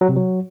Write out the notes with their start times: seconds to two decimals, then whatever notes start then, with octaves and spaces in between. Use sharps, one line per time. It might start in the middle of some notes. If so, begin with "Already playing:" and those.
0.01 F#3
0.09 C3
0.16 F#3